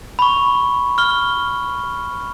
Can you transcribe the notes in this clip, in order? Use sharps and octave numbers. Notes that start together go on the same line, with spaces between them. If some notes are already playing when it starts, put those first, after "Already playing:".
B5 C#6
F6 G7